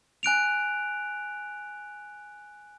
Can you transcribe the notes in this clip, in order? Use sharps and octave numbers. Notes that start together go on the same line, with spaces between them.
G#5 F#6 D7 F7